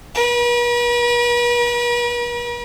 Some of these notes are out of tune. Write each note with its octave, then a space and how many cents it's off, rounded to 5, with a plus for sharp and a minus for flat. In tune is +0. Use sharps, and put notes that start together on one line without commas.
B4 -45